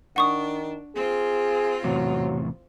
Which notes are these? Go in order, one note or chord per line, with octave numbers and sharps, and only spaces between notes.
D#3 D4 F#5 C#6 D#6
C4 F4 G#4
E2 A2 C3 F#3